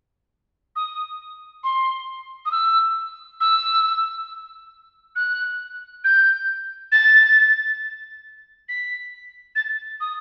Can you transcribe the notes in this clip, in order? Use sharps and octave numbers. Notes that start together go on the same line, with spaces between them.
D#6
C6
D#6
E6
E6
F#6
G6
A6
B6
A6
D#6